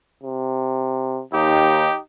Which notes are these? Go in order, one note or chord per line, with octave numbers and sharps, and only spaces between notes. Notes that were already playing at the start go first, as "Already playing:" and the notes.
C3
D#2 D#4 G4